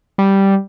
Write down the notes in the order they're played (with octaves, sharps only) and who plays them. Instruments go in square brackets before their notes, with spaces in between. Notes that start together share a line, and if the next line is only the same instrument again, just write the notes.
[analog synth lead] G3